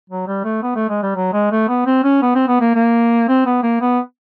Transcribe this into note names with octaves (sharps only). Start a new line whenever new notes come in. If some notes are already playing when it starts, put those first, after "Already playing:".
F#3
G3
A3
B3
A3
G#3
G3
F#3
G#3
A3
B3
C4
C#4
B3
C4
B3
A#3
A#3
C4
B3
A#3
B3